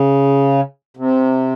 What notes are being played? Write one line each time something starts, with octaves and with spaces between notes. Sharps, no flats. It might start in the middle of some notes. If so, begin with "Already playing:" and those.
Already playing: C#3
C3